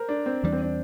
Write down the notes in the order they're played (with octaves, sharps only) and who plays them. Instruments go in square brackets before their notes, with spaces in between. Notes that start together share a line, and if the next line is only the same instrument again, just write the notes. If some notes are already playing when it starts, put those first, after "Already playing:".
Already playing: [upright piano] A#4 C5
D4
C4
[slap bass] E2 E3 G3 [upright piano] D4
[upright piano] C4
D4